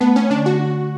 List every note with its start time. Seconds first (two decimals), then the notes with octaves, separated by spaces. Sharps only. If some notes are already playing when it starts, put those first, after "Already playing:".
0.01 A3 B3
0.16 C#4
0.30 D3 D4
0.46 F#4